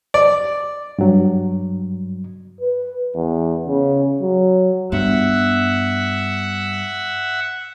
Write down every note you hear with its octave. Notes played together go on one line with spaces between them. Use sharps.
D5
G2 F#3
B4
E2
C#3
F#3
G2 B3 E5 F#5